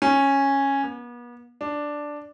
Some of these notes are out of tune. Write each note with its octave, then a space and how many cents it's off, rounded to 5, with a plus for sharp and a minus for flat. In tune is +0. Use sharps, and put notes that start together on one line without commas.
C#4 -10
B3 -40
D4 +0